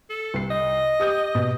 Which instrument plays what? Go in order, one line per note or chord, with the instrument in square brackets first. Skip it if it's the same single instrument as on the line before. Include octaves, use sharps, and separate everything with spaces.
[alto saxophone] A4
[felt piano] C2 C7
[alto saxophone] D#5
[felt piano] G4 D#6 G6
B2